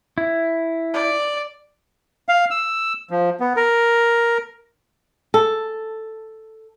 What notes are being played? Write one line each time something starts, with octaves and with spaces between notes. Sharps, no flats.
E4
D5
F5
E6
F3
B3
A#4
A4